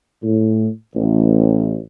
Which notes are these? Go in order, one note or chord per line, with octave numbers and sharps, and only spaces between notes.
A2
A1